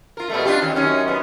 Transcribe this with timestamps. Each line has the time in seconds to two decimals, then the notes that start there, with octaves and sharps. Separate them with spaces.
0.17 F4 A#4
0.30 B2 G3 A3
0.46 D4 F4 G4
0.62 D#3 C#4
0.75 F#2 C#4 D#4
1.08 F#2 B3